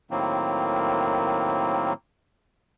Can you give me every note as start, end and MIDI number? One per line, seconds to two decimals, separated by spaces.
0.11 1.93 45
0.11 1.93 51
0.11 1.93 54
0.11 1.93 58
0.11 1.93 60